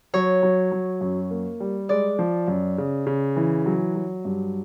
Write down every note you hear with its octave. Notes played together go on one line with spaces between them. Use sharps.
F#3 C#5
F#3
F#3
F#2
A#3
G3
G#3 D5
F3
F#2
C#3
C#3
E3
F#3
F#3
G2